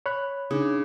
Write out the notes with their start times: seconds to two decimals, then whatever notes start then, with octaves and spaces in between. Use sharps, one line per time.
0.06 C#5 B5 F#6
0.51 C#3 D4 D#4